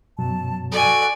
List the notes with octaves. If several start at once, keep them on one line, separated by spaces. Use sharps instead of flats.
F#2 B2 F#3 A5
F#4 A4 D5 G#5